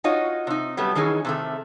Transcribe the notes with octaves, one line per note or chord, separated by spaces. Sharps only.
D#4 F4 F#4 C#5 D#5
C3 D#4
F#3 G3 A3 B3
D#3 E3 C#4 D#4 G#4
C3 D#3 A3